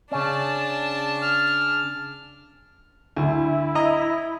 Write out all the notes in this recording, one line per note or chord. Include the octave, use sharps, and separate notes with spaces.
C#3 C#4 D4 A5
F6
D2 E4
D#5 A#5